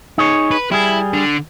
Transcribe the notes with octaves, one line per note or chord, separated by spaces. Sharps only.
D#4 G#4 C#5
B4
G3 E4 G#4
D3